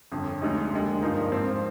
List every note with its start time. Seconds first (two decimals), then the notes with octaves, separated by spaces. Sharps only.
0.11 G1 F2 D3
0.42 D2 D3 G#3 D#4
0.72 D#2 D3 G#3
1.02 G2 F3 A#3 D#4
1.32 G#2 F3 C4